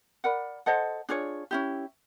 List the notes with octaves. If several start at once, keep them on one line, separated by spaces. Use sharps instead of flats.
A#4 D5 F#5 B5
A4 C5 D#5 F#5
D4 F4 G#4 C#5
C#4 E4 G4